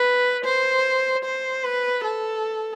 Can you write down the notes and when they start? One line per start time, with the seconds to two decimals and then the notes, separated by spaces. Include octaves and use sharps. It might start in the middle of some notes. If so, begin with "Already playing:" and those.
Already playing: B4
0.44 C5
1.25 C5
1.64 B4
2.04 A4